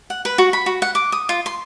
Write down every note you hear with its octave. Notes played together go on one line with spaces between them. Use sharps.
F#5
B4
F#4
B5
F#4
F#5
D6
D#6
F4
C6